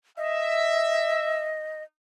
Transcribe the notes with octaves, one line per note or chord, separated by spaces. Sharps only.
D#5 E5